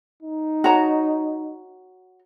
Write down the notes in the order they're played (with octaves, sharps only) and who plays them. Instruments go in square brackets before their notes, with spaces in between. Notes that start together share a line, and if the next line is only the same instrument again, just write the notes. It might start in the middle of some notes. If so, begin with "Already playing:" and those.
[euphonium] D#4
[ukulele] F#4 C#5 A#5